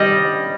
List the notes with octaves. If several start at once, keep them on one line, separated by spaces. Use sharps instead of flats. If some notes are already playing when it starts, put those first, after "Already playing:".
Already playing: G3 D#5